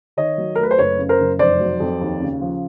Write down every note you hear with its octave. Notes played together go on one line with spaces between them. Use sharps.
D#3 C#5 D#5
F#3
A3 A#4
B4
C5
F#1 B4 C#5
C#3
A#4 C5
F#1
F1 C5 D5
F#3
F2
D#2
C#3
F3